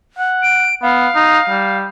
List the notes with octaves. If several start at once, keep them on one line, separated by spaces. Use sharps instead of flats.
F#5
D7
B3 F5
D#4
G3